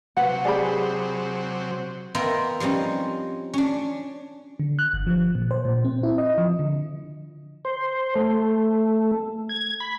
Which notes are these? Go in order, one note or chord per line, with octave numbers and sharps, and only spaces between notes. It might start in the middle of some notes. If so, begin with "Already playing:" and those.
C3 F#3 B4 F#5
G4 G#4 D5 B5
B3 F4 A#4 D#5 E5 G5
F3 G3 C4 C#4 D#4
C#4 D4
D3
F#6
G1
F3
A#2
C5
A#2
C4
E4
D#5
F3
D3
C5
A3
G#6
B5